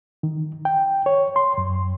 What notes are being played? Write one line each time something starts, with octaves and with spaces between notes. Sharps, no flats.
D#3
G5
C#5
C6
F#2